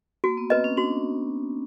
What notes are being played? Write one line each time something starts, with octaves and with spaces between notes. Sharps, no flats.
A#3 F#4
B3
C4 B4 D#5
C#4
D4 F#4